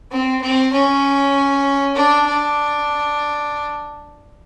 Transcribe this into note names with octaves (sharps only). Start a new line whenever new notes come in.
C4
C4
C#4
D4
D4